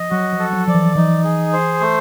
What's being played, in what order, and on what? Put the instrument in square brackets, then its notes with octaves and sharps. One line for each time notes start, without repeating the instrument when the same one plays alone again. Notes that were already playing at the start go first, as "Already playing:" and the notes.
Already playing: [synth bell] F3 [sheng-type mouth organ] D#5
[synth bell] F#3 [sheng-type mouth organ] F#4
[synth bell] F3
[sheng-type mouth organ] A4
[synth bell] F#3
[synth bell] F3 [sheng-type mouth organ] D5
[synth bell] E3
[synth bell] E3 [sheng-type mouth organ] D#4
[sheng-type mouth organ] G#4
C5
A3